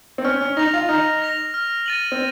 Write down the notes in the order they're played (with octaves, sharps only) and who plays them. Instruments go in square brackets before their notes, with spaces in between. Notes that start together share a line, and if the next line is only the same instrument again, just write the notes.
[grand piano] C4
[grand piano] C#4 [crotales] F6
[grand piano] C#4
[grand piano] D#4 [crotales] A#6 F7
[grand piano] F4
[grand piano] D#4 [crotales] F6
[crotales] A#6 F7
F6
A6 D#7 F#7
[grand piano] C4